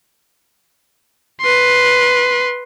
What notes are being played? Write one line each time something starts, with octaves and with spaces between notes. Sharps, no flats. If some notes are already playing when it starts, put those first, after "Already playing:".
B4 C6